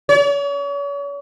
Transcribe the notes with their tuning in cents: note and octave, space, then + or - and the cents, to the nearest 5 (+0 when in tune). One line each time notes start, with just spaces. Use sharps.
C#5 +40